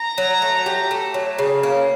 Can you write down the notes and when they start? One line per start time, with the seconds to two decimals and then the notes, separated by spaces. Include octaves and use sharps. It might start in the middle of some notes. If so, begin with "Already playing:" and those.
Already playing: A#5
0.18 F#3
0.42 A3
0.66 G4
0.91 A3
1.14 F#3
1.39 C#3
1.63 A#3